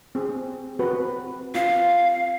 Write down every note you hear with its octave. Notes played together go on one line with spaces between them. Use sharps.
C4 G#4
C4 F#4 B4
C4 F4 F5